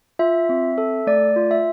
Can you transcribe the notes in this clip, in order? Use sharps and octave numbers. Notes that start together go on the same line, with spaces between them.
F4 E5
C4
A4
A3 D5
F4
E5